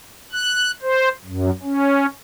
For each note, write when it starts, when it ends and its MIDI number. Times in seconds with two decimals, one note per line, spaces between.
0.32 0.71 90
0.82 1.09 72
1.25 1.50 42
1.63 2.06 61